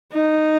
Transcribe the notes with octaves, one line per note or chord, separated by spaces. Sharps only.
D#4